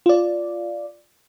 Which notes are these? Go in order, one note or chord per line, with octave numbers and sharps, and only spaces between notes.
F4 D5